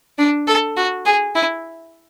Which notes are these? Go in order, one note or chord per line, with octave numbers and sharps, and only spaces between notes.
D4
A4
F#4
G#4
E4